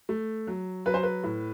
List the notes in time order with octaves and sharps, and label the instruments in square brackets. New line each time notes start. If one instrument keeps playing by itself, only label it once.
[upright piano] A3
F#3
F#3 B4
C5
B4
A2